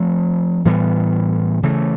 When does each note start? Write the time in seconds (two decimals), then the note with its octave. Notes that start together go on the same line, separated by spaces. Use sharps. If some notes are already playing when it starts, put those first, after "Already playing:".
Already playing: F3 A3 C4
0.65 A2 E3 G3 B3
1.63 C#3 E3 A3